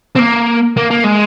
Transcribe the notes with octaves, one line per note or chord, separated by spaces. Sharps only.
C4
A#3
A#3
A#3
G#3